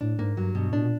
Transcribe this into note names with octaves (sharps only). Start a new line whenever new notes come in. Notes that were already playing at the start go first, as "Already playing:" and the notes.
A2 D4
G#2 A#3
G2 F#3
G2 B2
A2 D4
A#2